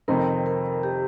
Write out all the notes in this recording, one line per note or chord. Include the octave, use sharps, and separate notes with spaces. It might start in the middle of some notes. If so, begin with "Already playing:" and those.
F2 C3 D#3 C4 D#4 A#4
A#4
G4